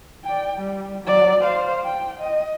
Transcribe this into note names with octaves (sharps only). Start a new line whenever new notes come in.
D5 G5
G3
F#3 D5
C5 F5
G5
D#5